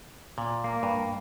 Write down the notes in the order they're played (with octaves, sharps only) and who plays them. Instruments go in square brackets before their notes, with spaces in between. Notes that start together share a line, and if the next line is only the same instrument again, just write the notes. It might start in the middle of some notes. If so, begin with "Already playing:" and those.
[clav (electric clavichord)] A#2
[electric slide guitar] A#3
[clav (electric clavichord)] G2